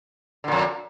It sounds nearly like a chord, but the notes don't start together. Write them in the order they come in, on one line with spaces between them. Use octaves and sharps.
D3 A#2 F2